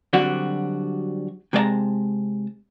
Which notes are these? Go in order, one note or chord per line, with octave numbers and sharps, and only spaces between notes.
D3 F#3 G3 C4 D4 F#4
C3 G#3 B4 D5 A5 A#5